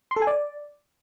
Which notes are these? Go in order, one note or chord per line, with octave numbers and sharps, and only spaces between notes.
C6
A4
G#5
D5